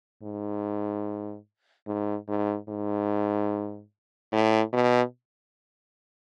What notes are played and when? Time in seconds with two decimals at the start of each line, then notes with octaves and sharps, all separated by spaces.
0.23 G#2
1.87 G#2
2.28 G#2
2.68 G#2
4.32 A2
4.73 B2